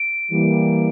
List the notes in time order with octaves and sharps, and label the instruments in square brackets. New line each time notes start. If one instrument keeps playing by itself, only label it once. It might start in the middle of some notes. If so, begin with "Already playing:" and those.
Already playing: [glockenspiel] D7
[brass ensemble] E3 G3 A#3